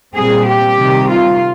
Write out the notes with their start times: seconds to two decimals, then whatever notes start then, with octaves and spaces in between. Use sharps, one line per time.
0.15 A#2 G3 C4 G#4
0.47 G4
0.78 C3 D#3 G3
1.09 F4